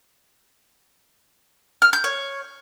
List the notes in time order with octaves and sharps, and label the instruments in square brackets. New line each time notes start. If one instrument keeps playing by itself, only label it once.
[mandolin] F6
G6
C#5